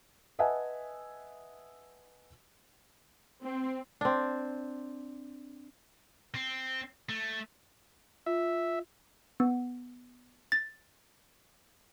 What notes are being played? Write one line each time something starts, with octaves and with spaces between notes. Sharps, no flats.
B4 D#5 E5 F#5 G#5 A5
C4
C4 D4
C4
A3
F4 E5
B3
A6